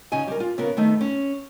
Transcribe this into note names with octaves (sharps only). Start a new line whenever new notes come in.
C#3 C#4 D#4 D#5 G#5
G3 A#4
F4
C#3 B3 A#4
D#3 A3 B3 D#4
C#4